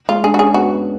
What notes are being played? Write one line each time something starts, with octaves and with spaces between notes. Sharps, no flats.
G#3 F4
D4 G#4
F#4
C#4 G#4
B3 F#4